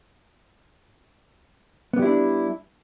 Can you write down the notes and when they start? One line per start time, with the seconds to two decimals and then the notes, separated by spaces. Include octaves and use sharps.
1.93 B3
1.96 G3
1.99 G4
2.02 E4
2.05 D4